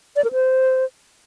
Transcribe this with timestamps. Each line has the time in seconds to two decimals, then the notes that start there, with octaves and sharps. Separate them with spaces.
0.16 D5
0.24 A#4
0.33 C5